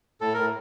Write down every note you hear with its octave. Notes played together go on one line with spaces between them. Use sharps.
A2 A4
A2 A#4